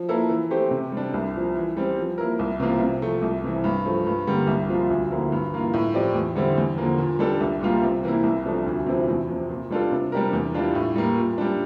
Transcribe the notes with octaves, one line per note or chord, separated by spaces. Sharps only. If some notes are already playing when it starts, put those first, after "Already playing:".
Already playing: F3
A#3 E4 A4
E3
A3 C4 G4 C5
C3
G3 D4
C2
A#2 F3
E3
G3 C4
F3
A#3 E4 A#4
C2
C3 E3 A#3 F4
C3
F3 A3
C2
C3 E3
G2
F3 A3
G2
D3 G3 A#3
C2
A#2 F3 C4 F4
D2
D3 F3 A#3 E4
G2
E3 A#3 F4
A2
F3 C4 G4 D5
E2
D3 G3 C4 E4
E2
D3 F3 A#3
A#2
G3 D4 A4
C2
A#2 G3 A#3 F4
C3
E3 A#3 E4
C2
C3 F3 A3 D4
D2
C3 F3 C4 E4
E2
C3 F3
A#2
G3 D4 F4 A4
C3
G3 D4 G4 A#4
E2
E3 G3 D4 F4
A2
G3 A#3
A#2
G3 D4